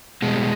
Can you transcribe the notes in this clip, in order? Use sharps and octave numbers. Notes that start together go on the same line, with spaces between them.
B2 G3 G#3